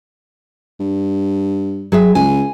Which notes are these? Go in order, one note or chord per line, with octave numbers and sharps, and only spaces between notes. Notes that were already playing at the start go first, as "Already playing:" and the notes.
G2
F#3 G#4 E5
C#2 G#5